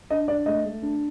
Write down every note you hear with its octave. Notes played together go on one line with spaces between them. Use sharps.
D4 D#5
D4 D5
A3 D#5
A3
D4